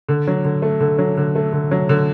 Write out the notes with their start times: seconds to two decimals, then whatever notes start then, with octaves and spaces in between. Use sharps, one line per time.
0.08 D3
0.27 F#3
0.45 D3
0.62 A3
0.80 D3
0.98 F#3
1.17 D3
1.35 A3
1.53 D3
1.71 F#3
1.89 D3